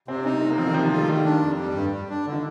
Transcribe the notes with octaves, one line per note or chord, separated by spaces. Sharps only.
C3 C4
D4
C4 D#4
G3
C3 A3
A#3
F3 C4
D#3
C3 F3
G3
F4
A3
D#3 G3
D4
F2
G3
G2
G3
D4
D3
D#3